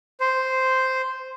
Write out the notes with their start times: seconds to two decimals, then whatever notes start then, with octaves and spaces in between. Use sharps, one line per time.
0.20 C5